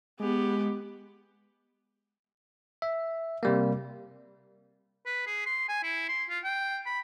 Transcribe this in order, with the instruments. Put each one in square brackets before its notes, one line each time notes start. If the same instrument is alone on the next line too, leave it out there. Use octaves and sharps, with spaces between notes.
[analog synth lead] G#3 [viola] B3 G4
[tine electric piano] E5
C3 G3 A#3
[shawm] B4
G#4
C6
G#5
E4
C6
F4
G5
B5